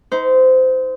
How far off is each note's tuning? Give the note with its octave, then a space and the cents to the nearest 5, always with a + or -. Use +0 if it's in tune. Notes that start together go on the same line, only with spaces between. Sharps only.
D#4 +35 C5 -20